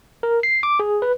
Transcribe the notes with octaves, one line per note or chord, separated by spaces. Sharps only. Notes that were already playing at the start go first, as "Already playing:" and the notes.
A#4
C7
D6
G#4
B4